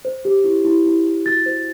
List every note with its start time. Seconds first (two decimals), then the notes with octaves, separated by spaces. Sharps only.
0.05 C5
0.25 G4
0.44 E4
0.65 E4
0.86 E4
1.05 E4
1.26 F#4 A6
1.46 C5